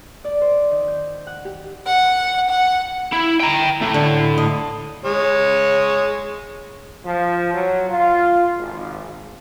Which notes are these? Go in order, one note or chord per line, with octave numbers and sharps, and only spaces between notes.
D5
C5
D#3
G6
F#5
G4
F#5
F#5
E4
G5 A#5
A3 E4
D3
D#5
G#3 C#5
F3
F#3
F4
G#1